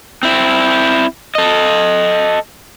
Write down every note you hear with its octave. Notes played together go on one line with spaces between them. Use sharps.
C4 E4
A4 D#5